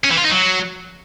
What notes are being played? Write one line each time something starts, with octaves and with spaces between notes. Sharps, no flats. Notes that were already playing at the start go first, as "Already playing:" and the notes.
C#4
E3
F4
D#4
F#3